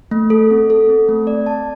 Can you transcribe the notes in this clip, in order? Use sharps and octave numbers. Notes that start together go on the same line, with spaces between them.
A3
A4
C4
A4
C4
A3
D5
A5